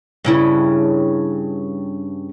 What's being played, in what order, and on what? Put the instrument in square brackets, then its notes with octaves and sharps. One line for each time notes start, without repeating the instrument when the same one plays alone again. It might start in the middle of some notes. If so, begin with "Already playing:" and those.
[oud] G2 C#3 E4